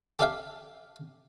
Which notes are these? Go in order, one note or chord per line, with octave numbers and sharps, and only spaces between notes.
G4 A4 D5 E5 F5 G5